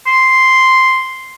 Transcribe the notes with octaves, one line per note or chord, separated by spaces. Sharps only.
C6